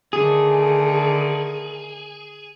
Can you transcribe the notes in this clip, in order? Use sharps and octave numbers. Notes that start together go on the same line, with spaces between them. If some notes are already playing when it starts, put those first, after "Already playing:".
D3 D#3 A3 G#4